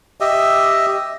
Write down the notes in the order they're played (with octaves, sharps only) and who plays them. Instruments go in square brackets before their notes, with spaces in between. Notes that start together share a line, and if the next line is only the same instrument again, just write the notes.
[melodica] G4 D#5 E5